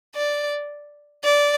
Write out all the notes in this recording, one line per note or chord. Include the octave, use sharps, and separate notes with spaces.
D5
D5